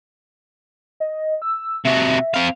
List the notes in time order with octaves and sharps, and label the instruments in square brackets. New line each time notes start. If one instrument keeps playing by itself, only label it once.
[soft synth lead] D#5
E6
[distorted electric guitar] C3 F#4 [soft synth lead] E5
[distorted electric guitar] C4 F5